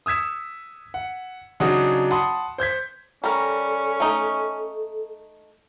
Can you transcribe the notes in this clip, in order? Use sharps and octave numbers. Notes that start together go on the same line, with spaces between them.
D#6 E6 G#6 B6 E7
F#5
C#3 F#3 D4 D#4 F#4 G#4
F#5 A5 B5 C6 D#6
C5 G6 G#6 B6
G3 C#4 A4 A#4
A3 D#4